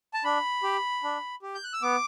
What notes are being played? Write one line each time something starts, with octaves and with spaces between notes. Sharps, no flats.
A5
D4 B5
G4
D4
G4
G6
F#6
E6
B3 D6